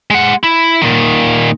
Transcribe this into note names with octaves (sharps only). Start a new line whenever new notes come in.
G#3 F#5
E4
A#2 D#3